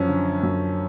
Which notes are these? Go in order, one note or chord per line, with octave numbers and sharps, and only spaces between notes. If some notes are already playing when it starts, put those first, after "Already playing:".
Already playing: F#2 F3 C#4
D3
F#2